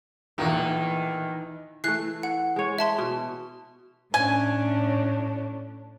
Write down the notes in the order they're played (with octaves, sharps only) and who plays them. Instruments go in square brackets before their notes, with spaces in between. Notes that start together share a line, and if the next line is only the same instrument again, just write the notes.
[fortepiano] B1 E2 A#2 [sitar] D#3 [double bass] E3
[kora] E3 A3 [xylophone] F#6 C7
[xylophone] F#5
[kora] G#3 C#5
[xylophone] E5 A5 C6
[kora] B2
[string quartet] A2 C#4 D4 [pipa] G#5